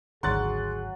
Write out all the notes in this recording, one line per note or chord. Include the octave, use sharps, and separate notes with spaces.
G#1 D2 D3 F#3 G#4 C6 F#6 A6